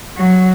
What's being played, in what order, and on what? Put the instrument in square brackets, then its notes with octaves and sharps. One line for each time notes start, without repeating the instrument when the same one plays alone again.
[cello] F#3